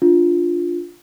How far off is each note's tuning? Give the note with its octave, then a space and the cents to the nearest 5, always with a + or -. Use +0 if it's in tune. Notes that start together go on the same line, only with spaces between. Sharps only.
D4 +0 F4 +0